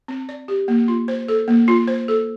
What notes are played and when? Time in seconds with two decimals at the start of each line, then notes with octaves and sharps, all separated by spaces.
0.08 C4
0.29 D5
0.48 G4
0.68 A#3
0.88 F4
1.08 C5
1.28 A4
1.48 A#3
1.68 F4
1.88 C5
2.08 A4